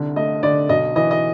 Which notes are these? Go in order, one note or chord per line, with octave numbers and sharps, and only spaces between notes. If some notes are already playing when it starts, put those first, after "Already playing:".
Already playing: C2 D3
A3 D#5
D3 D5
B1 D#5
E3 D#5
D#5